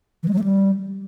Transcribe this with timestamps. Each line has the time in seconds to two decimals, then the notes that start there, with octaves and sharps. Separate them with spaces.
0.23 E3
0.28 G#3
0.33 F#3
0.39 A3
0.44 G3